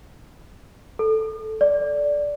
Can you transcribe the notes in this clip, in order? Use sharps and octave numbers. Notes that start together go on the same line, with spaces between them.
A4
D5